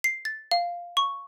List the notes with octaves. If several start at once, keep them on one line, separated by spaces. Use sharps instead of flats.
C7
A6
F5
C#6